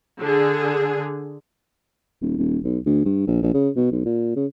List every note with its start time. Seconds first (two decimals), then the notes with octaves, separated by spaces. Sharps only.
0.22 D3 G#4
2.22 D#1
2.38 D#1
2.64 B1
2.86 D2
3.05 G2
3.27 A#1
3.42 A#1
3.54 C#3
3.76 B2
3.92 B1
4.06 A#2
4.36 C#3